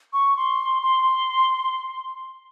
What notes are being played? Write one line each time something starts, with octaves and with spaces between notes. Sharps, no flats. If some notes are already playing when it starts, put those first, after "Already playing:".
C#6
C6
C6